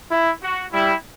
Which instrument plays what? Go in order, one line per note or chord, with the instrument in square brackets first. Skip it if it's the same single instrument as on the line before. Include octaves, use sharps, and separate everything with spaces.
[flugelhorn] E4
[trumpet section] F#4
[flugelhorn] G3 [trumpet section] E4